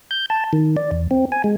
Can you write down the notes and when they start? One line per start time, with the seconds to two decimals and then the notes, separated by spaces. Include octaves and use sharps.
0.11 G6
0.30 A5
0.53 D#3
0.77 D5
0.91 E2
1.11 C4
1.32 G#5
1.44 G#3